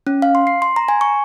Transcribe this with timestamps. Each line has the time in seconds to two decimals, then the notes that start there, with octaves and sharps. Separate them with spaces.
0.07 C#4
0.22 F5
0.35 C6
0.47 C7
0.62 C6
0.76 A#5
0.88 G#5
1.01 C#6